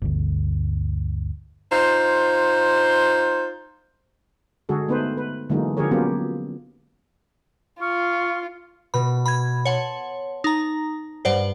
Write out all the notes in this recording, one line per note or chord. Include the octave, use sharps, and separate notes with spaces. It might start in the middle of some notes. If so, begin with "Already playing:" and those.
G1 D2
D#4 F4 C5
D3 G#3 F#4 G#4 A4
A3 B3 D#4 B4 C5
B4
D3 E3 F#3 G#3 A#3 D#4
D3 F3 G4 G#4 A#4 C#5
F#3 A#3 B3 C#4 F4 G4
F4 C#6 F6
B2 B5
B5 G#6
C#5 F#5 A5 C6
D#4 A#5
G2 C5 D5 F#5